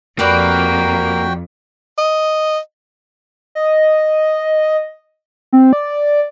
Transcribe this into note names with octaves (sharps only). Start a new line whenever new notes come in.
F2 A#3 F#4 G4 B4 D5 G5
D#5
D#5
C4
D5